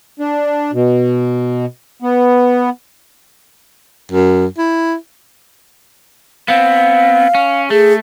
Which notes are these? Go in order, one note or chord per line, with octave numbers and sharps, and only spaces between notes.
D4
B2
B3
F#2
E4
B3 C4 F5
C#4
A3 G#4